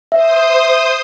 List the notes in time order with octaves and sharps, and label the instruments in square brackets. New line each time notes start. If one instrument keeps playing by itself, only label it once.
[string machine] C5 D#6 [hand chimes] E5